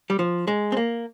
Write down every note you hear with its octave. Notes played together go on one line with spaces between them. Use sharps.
G3
F3
G#3
C4
A#3